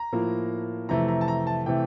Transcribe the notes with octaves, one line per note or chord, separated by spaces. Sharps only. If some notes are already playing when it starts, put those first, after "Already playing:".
Already playing: A#5
A2 F3 A#3
F2 C3 E3 A3 A#5
A#5
A5
A#5
A5
C3 E3 A3 G5